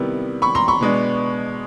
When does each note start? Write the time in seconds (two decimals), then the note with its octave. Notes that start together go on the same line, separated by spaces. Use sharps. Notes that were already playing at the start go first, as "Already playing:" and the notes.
Already playing: C3 D#3 G3 B3 E4
0.42 B5 C#6
0.55 A#5 C6
0.68 B5 C#6
0.81 B2 G#3 B3 D4